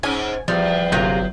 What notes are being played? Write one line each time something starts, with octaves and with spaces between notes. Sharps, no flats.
G#2 C#4 G#5
E2 F3 G3
G1 C3 F#3 A#3 F4 G6